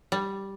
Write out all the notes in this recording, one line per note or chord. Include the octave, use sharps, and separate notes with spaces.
G3